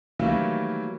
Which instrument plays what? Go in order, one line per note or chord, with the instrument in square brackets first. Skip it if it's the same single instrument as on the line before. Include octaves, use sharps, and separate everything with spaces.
[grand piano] D#3 E3 F#3 G3 A3 A#3